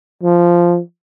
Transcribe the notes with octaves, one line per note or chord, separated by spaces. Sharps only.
F3